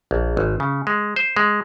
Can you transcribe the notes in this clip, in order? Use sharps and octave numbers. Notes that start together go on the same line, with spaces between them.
A#1
G#1
C#3
G#3
C5
G#3